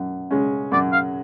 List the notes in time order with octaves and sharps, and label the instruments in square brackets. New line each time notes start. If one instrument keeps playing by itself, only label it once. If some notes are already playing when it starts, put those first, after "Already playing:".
Already playing: [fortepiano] F#2
C#3 G#3 C#4
[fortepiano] F#2 [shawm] D5
[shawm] F5